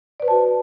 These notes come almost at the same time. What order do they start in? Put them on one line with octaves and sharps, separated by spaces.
D5 B4 C5 A5 F#4